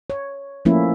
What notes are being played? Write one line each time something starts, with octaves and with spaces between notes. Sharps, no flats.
C#5
F3 A3 A#3 C#4 E4